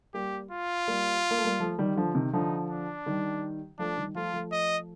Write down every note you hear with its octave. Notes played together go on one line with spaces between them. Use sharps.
G3 A#3 G4
F4
G3 A#3
A#3
A3
G3 A#3
F3 A3
D#3 G3
D3 F3
C3 D#3
D3 F3 D#4
D4
D#3 G3
F3 A3 D4
D#3 G3
F3 A3 F4
F3 A3
D#5